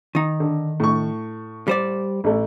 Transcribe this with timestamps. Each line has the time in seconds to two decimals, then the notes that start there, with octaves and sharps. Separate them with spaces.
0.15 D#3 D#4
0.40 D3
0.80 A2 C#6
1.68 G3 C5 D5
2.24 A1 A3